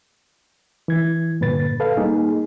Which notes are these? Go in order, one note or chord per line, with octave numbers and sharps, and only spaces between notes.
E3 G#6
G2 A#2 D3 B4 A6
A4 B4 F5
G3 A#3 D#4 G#4